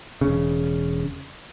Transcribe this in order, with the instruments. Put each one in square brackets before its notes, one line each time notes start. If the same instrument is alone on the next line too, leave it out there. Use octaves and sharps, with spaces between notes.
[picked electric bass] E1 C#3